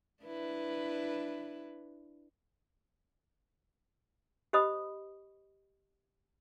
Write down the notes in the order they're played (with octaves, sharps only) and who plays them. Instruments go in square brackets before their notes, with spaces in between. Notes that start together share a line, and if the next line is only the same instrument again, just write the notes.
[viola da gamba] D4 E4 B4
[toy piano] G4 C5 D#5 B5 D#6